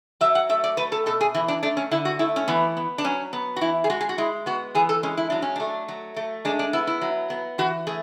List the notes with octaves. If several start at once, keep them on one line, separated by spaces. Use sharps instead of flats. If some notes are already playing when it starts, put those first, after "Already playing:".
F#3 E5
F#5
A3 E5
D5
A3 B4
A4
B2 A4
G#4
E3 E4
D4
A3 D4
C#4
D3 E4
F#4
A3 E4
C#4
E3 B3
B3
D4
F#3 C#4
B3
F#4
E3 E4
G#4
G#3 F#4
G#4
F#4
G#3 E4
B3 F#4
E3 G#4
A4
G#3 C#4
E4
F#3 D4
C#4
A3 D4
F#3
A3
G#3 D4
D4
B3 E4
E4
F#3
B3
E3 F#4
A3 G#4